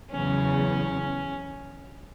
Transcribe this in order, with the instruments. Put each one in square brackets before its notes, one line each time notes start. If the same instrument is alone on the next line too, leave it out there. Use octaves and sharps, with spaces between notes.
[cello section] E2 C#3 F#3 [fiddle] C#4